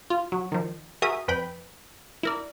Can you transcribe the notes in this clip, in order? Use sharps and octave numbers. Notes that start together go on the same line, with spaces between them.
F4
F#3
D#3 F3
F#4 G#4 A#4 E5 D#6
F2 B4 G5 B5
E4 A#4 D5